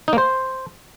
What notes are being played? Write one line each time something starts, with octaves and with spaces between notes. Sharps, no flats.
D#4
A#3
C5